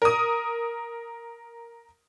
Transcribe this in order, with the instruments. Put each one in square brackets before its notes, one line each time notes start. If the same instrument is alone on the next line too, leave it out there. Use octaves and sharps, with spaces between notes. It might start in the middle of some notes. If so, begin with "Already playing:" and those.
[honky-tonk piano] A#4 D#6